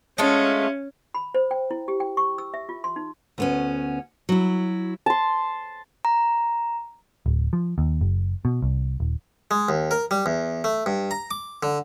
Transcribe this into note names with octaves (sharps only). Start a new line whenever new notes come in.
G#3 A3 C#4 F4
B5
C5
G5
E4
G4
G5
C#6
E6
E5
F4
C6
D#4
D2 B3 C#4
F#3 E4
A5 C6
A#5
D1
F3
D#2
F#1
B2
C2
D#1
G#3
D#2
A#4
G3
E2
A3
G2
A#5
D6
D3